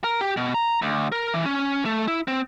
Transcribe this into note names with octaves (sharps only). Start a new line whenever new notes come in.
A#4
G4
B2
A#5
D2
A#4
E3
C#4
A3
E4
C4